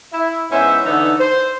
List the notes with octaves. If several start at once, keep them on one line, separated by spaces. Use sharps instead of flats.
E4
G#2 B3 C#4 E4 C5 E5
D3 E3 B3 D#4 A4
C5